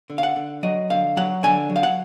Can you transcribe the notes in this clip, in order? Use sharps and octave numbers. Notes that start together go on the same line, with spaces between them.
D3
F5
F#5
D3
F#3 D#5
D3 F5
F#3 F#5
D3 G#5
F#3
F5
F#5